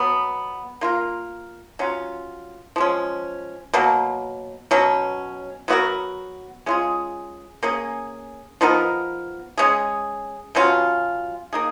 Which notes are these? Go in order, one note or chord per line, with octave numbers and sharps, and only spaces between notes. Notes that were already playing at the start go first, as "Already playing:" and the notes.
Already playing: B2 F#3 B3
A#3 F4 A#4
F#3 C#4 F4
F3 G#3 C#4
B2 F#3 A#3
B2 F#3 C#4
F#3 B3 F#4 A#4
G#3 C#4 F4 G#4
A#3 C#4 G#4
F3 B3 D#4 A#4
G#3 C#4 G#4
B2 F#3 C#4 F4
A#3 D#4 G#4